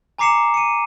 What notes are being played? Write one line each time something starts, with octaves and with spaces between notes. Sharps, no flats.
G#5 A#5 D6 C7 C#7 E7
C#7 D#7